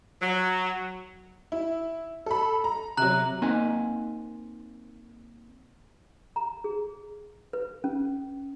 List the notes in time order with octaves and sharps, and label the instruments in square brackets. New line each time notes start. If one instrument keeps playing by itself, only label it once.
[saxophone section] F#3
[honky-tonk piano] E4
A4 B5
A#5
[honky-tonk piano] C3 F#3 [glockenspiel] A#5 F#6 F#7
[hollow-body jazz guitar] A#3 C4 D#4 G#5
[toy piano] A#5
G#4
B4
C#4